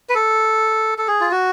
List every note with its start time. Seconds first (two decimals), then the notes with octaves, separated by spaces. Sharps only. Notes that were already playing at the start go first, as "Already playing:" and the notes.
0.09 B4
0.15 A4
0.98 A4
1.08 G#4
1.21 F4
1.31 F#4